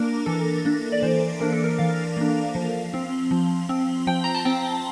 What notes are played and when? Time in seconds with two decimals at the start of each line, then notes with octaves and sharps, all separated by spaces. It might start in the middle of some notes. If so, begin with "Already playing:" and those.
Already playing: A#3 D4 A#4
0.26 E3 A4
0.65 A#3 D4
0.92 D5
1.03 E3 C5
1.40 A#3 D4 A#4
1.53 A4
1.64 A#4
1.79 E3 F5
2.17 A#3 D4
2.55 F3
2.94 C4
3.31 F3
3.69 C4
4.07 F3 G5
4.24 A#5
4.35 A5
4.45 C4 G5